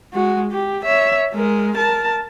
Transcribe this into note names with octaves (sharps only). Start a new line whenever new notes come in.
G#3 F#4
G4
C#5 E5
G#3 A#4
A#4 A5